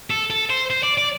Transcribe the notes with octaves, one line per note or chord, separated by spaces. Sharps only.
A4
A4
C5
C5
D5
D5